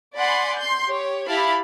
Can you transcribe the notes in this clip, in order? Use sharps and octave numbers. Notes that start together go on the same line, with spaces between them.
D5 F#5 G#5 B5 C6
C6 G6
G4 C#5
E4 G4 F5 A5 B5